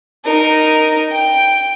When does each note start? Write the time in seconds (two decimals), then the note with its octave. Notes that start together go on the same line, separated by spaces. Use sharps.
0.24 D#4 A#4
1.11 G5